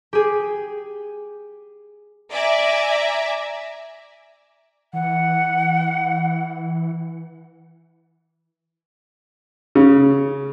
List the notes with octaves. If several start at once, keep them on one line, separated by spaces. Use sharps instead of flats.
G4 G#4
D5 E5 G#5 A#5
E3 F#5
C#3